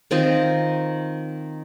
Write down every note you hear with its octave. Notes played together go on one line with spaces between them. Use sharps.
D#3 C4 D#4 F4